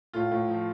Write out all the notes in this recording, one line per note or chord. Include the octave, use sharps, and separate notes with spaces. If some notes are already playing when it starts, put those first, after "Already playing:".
A2 F4
A2
F3